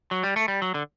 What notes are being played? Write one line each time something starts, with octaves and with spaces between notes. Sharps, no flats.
F#3
G3
A3
G3
F#3
D3